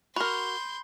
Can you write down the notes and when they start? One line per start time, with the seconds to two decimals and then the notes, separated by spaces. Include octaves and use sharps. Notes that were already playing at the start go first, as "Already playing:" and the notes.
0.16 F#4 A#4 B5 C6 G6